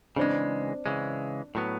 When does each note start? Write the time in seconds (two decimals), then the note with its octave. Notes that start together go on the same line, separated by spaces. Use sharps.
0.16 C#3 E3 G#3 C4 D4
0.86 C#3 E3 G#3
1.55 A2 F#3 B3